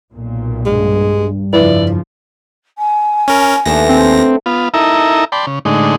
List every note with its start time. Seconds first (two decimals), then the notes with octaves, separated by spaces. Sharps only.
0.12 B1 A#2
0.66 G2 G#3
1.53 F2 C#3 F3 E4 B4 D5
2.78 G#5
3.28 C#4 A#4
3.65 D#2 A3 B3 D4 A#6
3.89 C4
4.46 B3 F4
4.74 D#4 E4 A4 A#4 E5 A#5
5.32 D5 G5 A5 B5 C6
5.47 C#3
5.65 A2 D3 G#3 D#4